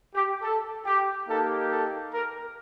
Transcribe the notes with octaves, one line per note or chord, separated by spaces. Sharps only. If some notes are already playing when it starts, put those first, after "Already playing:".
G4
A4
G4
A#3 D#4 G4 A4
A4
A#4